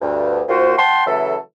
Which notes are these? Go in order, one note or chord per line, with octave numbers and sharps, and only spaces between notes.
D2 G2
D#2 A#2 F4 F#4 C5
F#5 G5 A5 C6
C#3 E3 F#3 A3 A4